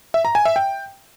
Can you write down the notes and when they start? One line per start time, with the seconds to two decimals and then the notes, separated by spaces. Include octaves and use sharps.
0.14 E5
0.25 A#5
0.35 G#5
0.45 E5
0.56 G5